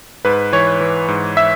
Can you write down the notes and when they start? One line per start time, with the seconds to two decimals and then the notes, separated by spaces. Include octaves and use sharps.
0.25 G#2 B4
0.53 E3 C#5
0.81 E3
1.08 G#2
1.37 E5